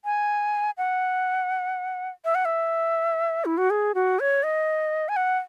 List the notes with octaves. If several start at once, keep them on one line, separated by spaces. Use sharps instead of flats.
G#5
F#5
E5
F#5
E5
E4
F#4
G#4
F#4
C#5
D#5
G#5
F#5